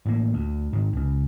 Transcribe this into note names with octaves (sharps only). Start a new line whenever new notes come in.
A1 A2 C3 A#3
D2
G#2 D#3
C#2 C#3